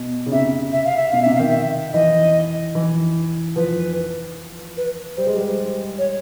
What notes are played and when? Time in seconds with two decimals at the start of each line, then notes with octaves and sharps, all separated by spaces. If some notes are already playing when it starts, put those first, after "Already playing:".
Already playing: B2
0.26 C#3
0.32 C3 E5
0.73 E5
0.85 F5
0.97 E5
1.10 B2 F5
1.22 C3 E5
1.35 D#3 F5
1.46 E5
1.93 E3 D#5
2.75 E3
3.56 F3 B4
4.77 B4
5.17 G3 C5
5.27 G#3
5.36 G3
5.98 C#5